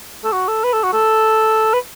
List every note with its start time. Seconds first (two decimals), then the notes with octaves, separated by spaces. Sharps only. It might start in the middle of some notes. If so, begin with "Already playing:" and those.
0.25 A4
0.32 F#4
0.48 A4
0.64 B4
0.73 A4
0.83 F#4
0.93 A4
1.74 B4